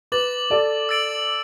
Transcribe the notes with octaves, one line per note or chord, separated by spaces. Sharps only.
B4 D6 A6 F#7
A4 D5
E6 A6 D7 F#7